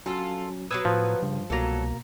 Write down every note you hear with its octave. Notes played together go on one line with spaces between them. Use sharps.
F#3 C#4 F4 A4
F#3 B3 B4 D#6 E6 G#6
A2 F3
G2 C#3
C2 B2 F#3 A#3 A4 A#5